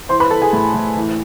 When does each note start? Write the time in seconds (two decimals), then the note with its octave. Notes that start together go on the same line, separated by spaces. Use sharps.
0.09 E3 C5 C6
0.20 B4 B5
0.31 E3 A4 A5
0.42 G#4 G#5
0.53 A2
0.74 A2
0.96 E3